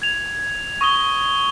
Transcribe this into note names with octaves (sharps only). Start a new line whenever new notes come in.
G#6 F7
C#6 D#6 G7